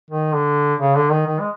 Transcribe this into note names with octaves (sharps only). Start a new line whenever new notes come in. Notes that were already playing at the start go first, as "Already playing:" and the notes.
D#3
D3
C#3
D3
D#3
D#3
G#3